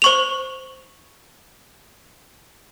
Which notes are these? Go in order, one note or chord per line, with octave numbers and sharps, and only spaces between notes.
C5 C#6 F7